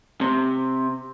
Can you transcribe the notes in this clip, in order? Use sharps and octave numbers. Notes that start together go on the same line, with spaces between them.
C3